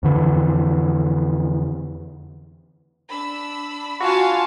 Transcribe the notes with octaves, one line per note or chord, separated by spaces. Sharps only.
F2 D3 E3
D4 B5 E6
F4 F#4 F5 G#5 A5 C#6